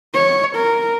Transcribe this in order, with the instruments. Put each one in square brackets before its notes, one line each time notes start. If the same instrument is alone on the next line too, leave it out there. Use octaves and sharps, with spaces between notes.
[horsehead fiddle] C#5
A#4